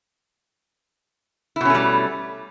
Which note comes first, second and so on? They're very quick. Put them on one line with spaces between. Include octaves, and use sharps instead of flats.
E4 B2 C#4 A3 G3